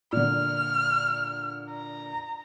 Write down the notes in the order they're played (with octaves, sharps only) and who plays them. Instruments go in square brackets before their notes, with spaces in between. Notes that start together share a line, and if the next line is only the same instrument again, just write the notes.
[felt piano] A#2 D3 [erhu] F6
[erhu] A#5